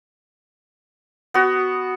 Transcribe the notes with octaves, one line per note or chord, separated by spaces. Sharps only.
B3 F#4